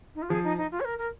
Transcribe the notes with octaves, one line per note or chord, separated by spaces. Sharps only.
D#4
F4
F3 G#4
D#4
D#4
F4
C#5
A#4
A#4